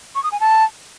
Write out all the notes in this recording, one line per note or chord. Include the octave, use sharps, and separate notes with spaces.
C#6
D#6
G#5
A5